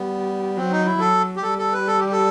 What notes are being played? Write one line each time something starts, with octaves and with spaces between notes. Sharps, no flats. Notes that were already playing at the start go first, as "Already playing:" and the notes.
Already playing: G3 B3
F#3 C4
D#4
E4
F#3 A4
G4
G3 A4
A4
B4
A4
G4
A4